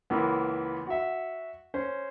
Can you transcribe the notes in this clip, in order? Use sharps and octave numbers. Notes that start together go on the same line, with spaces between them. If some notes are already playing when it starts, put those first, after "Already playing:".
C#2 E3 A#3 B3
F#4 E5
C#4 C5